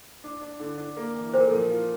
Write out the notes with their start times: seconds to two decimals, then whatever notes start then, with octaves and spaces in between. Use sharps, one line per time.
0.24 D4
0.41 D4
0.60 D3
0.78 D4
0.97 A#3
1.15 E3
1.34 A#2 C5
1.40 A#4
1.48 A4
1.51 F3 A#4
1.70 F4